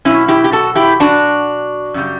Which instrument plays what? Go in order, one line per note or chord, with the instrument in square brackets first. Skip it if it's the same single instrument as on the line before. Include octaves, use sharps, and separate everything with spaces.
[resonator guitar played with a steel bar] B2 F#3 C#4 E4
E4 G4
G4
F#4 A4
E4 G4
D4 F#4
F#2 C#3 G3